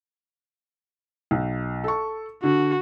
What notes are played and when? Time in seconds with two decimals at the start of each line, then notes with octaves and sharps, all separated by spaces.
1.31 B1
1.84 A4 C#6
2.43 D3 F#4